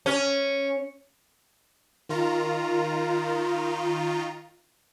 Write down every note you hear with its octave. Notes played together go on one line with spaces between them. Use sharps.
C#4
D#3 F4 A#5